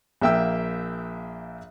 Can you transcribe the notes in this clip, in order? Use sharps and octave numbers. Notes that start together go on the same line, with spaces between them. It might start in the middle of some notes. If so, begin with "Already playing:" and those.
A#1 A#3 E5 G5 E6